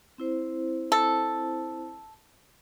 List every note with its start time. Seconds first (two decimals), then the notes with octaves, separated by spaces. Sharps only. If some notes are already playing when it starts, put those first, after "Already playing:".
0.18 C4 E4 C5
0.92 A4